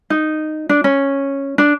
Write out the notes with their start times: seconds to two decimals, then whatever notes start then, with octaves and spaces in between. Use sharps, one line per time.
0.10 D#4
0.69 D4
0.84 C#4
1.58 D4